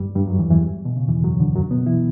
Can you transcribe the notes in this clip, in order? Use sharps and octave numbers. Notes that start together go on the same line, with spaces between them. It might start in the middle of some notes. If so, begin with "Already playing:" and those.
Already playing: G2 G3
G2 G3
F#2 F#3
E2 E3
E2 E3
B2
C#3
E2 E3
F#2 F#3
D2 D3
F#2 F#3
B2 B3
E3 E4